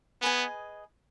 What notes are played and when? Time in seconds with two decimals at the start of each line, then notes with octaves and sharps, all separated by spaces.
0.22 B3 G#4 B4 D#5 G#5